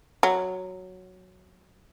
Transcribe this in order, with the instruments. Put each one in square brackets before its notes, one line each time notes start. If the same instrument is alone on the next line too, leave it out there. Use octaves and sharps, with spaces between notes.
[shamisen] F#3